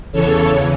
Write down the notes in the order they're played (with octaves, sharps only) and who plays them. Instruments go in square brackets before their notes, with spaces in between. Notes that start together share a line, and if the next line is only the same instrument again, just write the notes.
[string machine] E2 C#3 E3 A4 C#5